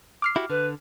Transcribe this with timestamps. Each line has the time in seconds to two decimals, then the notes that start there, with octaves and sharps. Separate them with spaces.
0.22 D6 F6 C7
0.36 E4 F#4 G4
0.50 D3 B4